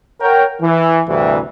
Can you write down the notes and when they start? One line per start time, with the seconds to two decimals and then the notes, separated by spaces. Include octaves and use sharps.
0.21 A#4 C#5 F#5 G5
0.62 E3
1.09 D2 G2 C3 E3